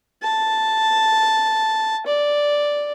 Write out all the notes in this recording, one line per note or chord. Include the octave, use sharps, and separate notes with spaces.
A5
D5